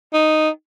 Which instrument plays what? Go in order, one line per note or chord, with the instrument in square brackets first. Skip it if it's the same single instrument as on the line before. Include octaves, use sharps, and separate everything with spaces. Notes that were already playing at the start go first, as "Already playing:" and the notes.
[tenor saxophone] D#4